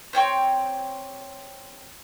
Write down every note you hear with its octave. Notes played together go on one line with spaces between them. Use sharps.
C4 C#5 G5 C6